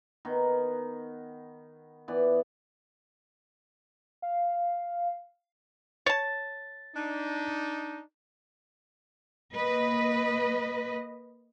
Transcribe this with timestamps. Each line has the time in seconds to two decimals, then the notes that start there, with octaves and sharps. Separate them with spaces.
0.25 D#3 B3
2.08 E3 B3 D5
4.22 F5
6.06 C#5 A5 A6
6.95 D4 D#4
9.53 A#3 B4 D#5